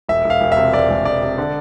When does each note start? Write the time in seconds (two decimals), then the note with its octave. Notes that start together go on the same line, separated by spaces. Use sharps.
0.08 E1 E5
0.24 E1
0.30 F5
0.41 E1
0.52 E5
0.57 C3
0.73 E1 D5
0.90 E1
1.05 E1 D5
1.21 C3
1.38 D3